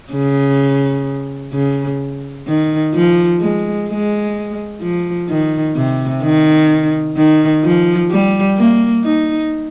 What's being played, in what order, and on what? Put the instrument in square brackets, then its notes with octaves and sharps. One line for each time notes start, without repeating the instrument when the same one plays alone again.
[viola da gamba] C#3
C#3
D#3
F3
G#3
G#3
F3
D#3
C3
D#3
D#3
F3
G3
A#3
D#4